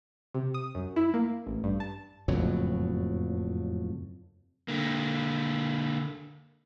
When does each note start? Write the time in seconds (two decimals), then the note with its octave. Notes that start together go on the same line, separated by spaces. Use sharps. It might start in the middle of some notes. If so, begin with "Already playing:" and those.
0.34 C3
0.54 D#6
0.75 F#2
0.96 E4
1.14 A#3
1.47 A1
1.64 G2
1.80 A5
2.28 F#1 F2 A2 F#3
4.68 D3 A#3